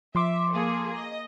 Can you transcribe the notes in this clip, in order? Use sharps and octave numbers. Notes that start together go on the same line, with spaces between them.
F3 E5 C6 D6
A#3 G#4 A4
D#5